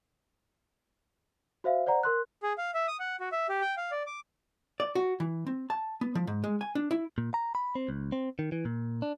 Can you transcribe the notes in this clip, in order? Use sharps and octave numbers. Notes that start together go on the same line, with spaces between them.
F#4 C5 E5 F5
C5 D5 F#5 A#5
A#4 C6 F#6
G#4
F5
E5
D#6
F#5
F#4
E5
G4
G5
F5
D5
D6
D5
F#4
E3
C4
A5
B3
F3
G#2
G#3
G#5
D4
E4
A#2
A#5
B5
C4
C#2
C4
D#3
E3
A#2
D4